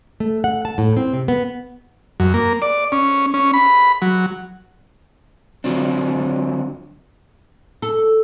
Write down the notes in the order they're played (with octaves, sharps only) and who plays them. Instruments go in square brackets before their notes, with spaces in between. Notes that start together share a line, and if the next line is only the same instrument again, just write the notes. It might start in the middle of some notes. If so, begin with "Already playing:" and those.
[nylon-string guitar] A3
F#5
A5
A2
C4
C3
B3
[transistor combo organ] F#2
A#3
D5
C#4
C#4
B5
F#3
[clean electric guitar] D3 F3 F#3 C4 D4
[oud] A4